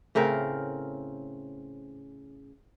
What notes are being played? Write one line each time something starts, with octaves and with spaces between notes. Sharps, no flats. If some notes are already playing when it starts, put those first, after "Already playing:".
A2 C#3 C4 A#4